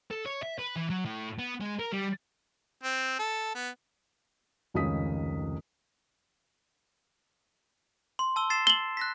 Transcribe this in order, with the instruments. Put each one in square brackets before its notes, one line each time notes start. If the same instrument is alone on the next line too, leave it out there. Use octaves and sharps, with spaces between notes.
[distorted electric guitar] A4
C#5
E5
B4
E3
F#3
A2
B3
G#3
A#4
G3
[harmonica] C4
A4
B3
[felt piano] F1 C#2 D#3 C#4 D#6 B6
[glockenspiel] C6
A5 E6 G7
A6 C7 E7
[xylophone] F#7 G7
[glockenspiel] F#6 A#6 B6